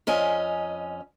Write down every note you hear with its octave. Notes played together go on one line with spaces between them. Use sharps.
F2 C#4 D#5 G#5